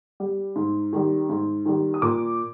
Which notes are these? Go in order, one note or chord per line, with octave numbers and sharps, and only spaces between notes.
G3
G#2
D#3 G3
G#2
D#3 G3
D#6
A#2 D6